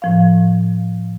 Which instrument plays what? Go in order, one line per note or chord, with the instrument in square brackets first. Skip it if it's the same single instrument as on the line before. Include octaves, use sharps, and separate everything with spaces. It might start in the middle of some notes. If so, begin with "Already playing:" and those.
[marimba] A2 F3 F5